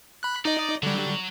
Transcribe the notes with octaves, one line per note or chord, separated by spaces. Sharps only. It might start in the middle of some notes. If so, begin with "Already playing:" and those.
B5 F#6
D#4 D5 D#5
D3 F#3 G3